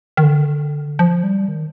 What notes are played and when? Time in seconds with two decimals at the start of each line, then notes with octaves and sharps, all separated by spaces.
0.17 D#3
0.23 D3
0.99 F3
1.24 G3
1.49 D#3